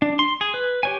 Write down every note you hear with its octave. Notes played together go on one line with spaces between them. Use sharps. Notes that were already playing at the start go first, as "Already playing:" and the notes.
D4
C6
G#4
B4
G4 C#5 G#5